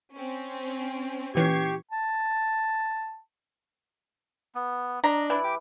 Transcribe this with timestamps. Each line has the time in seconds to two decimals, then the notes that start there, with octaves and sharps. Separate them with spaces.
0.12 C4 C#4
1.35 A#2 E3 C#4 G4 C#6 G#6 C7
1.91 A5
4.55 B3
5.04 D4 D#5 A#5
5.30 E3 D5
5.44 G4 D6